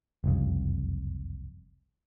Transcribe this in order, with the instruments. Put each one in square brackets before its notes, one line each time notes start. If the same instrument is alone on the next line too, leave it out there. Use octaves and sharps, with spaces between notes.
[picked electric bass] F#1 C2 F2